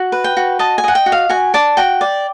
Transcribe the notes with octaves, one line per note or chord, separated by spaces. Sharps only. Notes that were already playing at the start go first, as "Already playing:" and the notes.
Already playing: F#4
B4
G5
F#4
D#5 A5
G#5
D#5 F#5
G5
F#4
F5
F#4 G#5
D5 A5
F#4 G5
D5